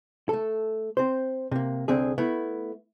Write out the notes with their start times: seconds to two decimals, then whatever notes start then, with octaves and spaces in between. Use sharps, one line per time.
0.29 A3 A4
0.97 C4 C5
1.51 C3 A#3
1.88 C2 D3 C4 G#4
2.18 A3 B3 E4